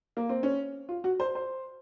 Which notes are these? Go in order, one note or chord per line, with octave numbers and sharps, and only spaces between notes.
A#3
C4
C#4
F4
F#4
C5
C5